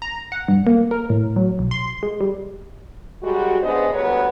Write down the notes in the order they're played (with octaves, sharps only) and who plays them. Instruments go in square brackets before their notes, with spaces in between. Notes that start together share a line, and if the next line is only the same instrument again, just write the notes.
[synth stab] A#5
F#5
G2
A#3
A#4
A2
F#3
B1
C6
G#3
G3
[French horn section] F#2 G3 G#3 F#4
C#3 G#3 B3 D4 C5 D#5
D2 G2 B3 A#4 B4 C#5